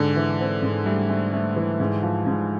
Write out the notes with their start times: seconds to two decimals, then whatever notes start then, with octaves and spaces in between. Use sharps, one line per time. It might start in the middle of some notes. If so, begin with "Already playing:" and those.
Already playing: G#2 D3
0.16 E3
0.40 C4
0.63 G#2
0.86 G3 A3
1.09 A3
1.33 A3
1.56 E3
1.80 G#2
2.03 F3
2.27 G#2